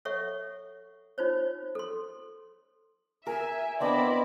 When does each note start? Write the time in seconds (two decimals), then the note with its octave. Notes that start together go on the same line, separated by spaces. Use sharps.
0.05 A4 C#5 E5 F#5 C#6
1.18 D#4 F4 C5 C#5
1.75 A4 C6
3.27 A#4 E5 G#5
3.80 B3 C4 D4 E4 D5 D#5 B5